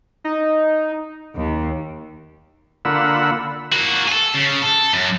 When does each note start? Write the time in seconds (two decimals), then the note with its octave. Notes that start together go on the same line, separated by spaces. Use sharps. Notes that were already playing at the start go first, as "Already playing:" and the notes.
0.24 D#4
1.36 D#2
2.85 D3 A#3 F4 F#5 B5 E6
3.72 A#3 F#4
4.08 G#4 A4
4.35 C#3
4.62 A4
4.93 F#2